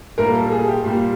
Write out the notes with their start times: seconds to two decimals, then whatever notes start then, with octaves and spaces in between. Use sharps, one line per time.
0.18 A#2 G3 A#3 A#4
0.35 A4
0.51 G#4
0.68 G4
0.84 A#2 G3 A#3